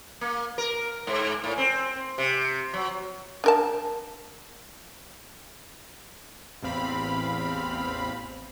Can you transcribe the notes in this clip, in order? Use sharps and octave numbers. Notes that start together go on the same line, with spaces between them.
A#3
A#4
G#2
A2
C4
C3
F#3
D4 A#4 A5
A1 E2 C4 F5 B5